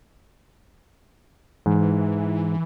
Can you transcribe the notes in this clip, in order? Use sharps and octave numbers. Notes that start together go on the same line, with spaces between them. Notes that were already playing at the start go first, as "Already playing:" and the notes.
G#2 E3